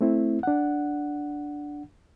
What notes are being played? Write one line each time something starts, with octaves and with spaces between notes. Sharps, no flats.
A3 C4 E4
D4 F#5